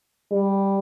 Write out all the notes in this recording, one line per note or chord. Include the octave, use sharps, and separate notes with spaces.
G3